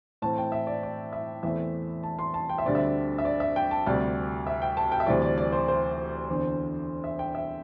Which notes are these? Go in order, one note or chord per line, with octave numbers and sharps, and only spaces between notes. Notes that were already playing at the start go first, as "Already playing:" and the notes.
A2 E3 C4 A5
G5
E5
D5
D5
E5
E2 E3 A3 C4 E5
A5
C6
A5
G5
E5
D2 D3 G3 C4 D5
E5
E5
D5
E5
G5
A5
D2 C3 G3 D5
E5
G5
A5
G5
E5
D2 C3 E3 G3 C4 D5
D5
D5
C5
C5
E2 D3 C4
E5
G5
E5